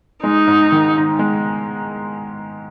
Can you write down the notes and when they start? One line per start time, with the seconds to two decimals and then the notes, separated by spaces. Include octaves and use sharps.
0.23 G#3 D#4
0.47 G#2
0.72 D#3
0.96 D#4
1.19 G#3